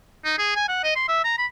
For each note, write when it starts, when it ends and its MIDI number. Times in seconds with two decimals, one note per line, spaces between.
0.25 0.34 63
0.38 0.53 68
0.55 0.69 80
0.69 0.80 78
0.84 0.92 75
0.96 1.04 84
1.08 1.23 76
1.24 1.37 82
1.38 1.46 83